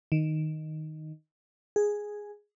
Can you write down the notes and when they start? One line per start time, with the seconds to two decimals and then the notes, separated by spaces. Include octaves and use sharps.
0.12 D#3
1.76 G#4